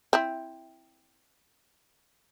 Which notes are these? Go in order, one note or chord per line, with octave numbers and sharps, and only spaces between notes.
C4 E4